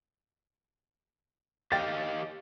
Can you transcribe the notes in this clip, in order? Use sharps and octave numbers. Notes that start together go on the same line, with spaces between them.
G4 D#5 F5 G5 A6